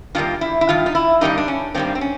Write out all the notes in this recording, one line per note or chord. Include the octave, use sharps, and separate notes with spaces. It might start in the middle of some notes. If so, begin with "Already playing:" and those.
G2 D#3 G3 A#3 F4
E4
E4
G2 D#3 F4
D#4
E4
G2 D#3 G3 A#3 D#4
D4
C#4
G2 D#3 G3 A#3 C4
C4
C#4